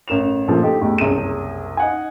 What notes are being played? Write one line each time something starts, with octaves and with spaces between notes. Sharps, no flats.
A1 A#4 E7 F7
A#1 A#2 C#3 F3 A3 A#3
D#4 G4 A4
E2 A2 G4
F#1 C2 G#4 D#7
D#4 F#5 G#5